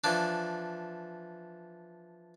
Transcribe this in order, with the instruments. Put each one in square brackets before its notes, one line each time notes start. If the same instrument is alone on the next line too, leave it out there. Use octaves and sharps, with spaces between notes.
[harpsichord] E3 F3 D4